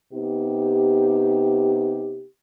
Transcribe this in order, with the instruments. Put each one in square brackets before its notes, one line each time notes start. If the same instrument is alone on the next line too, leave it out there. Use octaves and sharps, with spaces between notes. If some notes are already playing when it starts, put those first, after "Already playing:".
[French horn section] C3 B3 D#4 G4